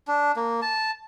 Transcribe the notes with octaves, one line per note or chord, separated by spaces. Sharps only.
D4
A#3
A5